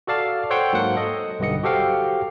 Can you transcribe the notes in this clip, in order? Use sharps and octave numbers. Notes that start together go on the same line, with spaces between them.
F#4 A4 D5 F5 A5
A4 C5 C#5 F#5 G5 C6
G#2 F#3 A#3 C5 F#5
A4 D#5
B1 G2 D3 D#5 C#7
F#4 G4 A4 C5 F5 G5